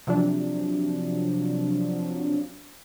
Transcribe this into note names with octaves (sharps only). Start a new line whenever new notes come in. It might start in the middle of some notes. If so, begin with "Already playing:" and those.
C3 F3 F#3 D4